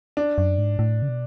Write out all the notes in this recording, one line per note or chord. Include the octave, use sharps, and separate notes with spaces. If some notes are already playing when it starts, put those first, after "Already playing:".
D4
F#2
G#2
A2
C#3
B2